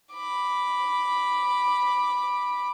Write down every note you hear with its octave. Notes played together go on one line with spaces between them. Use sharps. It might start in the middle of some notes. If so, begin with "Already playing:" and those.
B5 D6